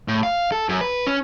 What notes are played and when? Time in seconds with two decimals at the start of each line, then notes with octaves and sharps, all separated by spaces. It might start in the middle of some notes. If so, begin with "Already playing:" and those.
0.08 A2
0.23 F5
0.52 A4
0.69 F#2
0.81 B4
1.06 C#4